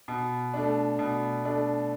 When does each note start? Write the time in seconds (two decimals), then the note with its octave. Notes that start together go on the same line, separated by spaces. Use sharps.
0.08 B2
0.54 A3 D4
0.99 B2
1.45 A3 D4